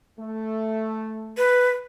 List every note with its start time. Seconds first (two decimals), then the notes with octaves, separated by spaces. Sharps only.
0.18 A3
1.38 B4